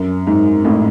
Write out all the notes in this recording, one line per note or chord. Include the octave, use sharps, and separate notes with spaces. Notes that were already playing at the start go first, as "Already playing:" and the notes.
Already playing: F#2
G#2
A1 A2